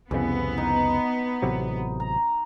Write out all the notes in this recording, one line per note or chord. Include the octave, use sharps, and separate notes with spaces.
C2 F2 C#3 E3 B3
D#4
A1 C3 F#3
A#5